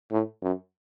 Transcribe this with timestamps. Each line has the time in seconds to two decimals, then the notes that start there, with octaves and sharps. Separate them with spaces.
0.11 A2
0.42 F#2